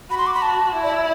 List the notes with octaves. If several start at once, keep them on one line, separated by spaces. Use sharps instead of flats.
F#4 B5
C6
D6
B5
A5
E4
D5
E5